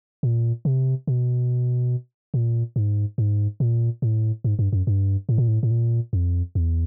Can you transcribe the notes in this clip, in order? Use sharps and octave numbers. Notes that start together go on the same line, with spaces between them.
A#2
C3
B2
A#2
G#2
G#2
A#2
A2
G#2
G2
F#2
G2
A2
A#2
A2
A2
A#2
F2
E2